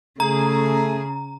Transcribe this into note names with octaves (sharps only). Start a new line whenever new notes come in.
C#3 A3 G#4 A#5